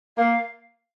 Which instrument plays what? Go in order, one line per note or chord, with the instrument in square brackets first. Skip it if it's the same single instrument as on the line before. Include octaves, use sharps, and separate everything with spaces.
[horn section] A#3 [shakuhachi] F5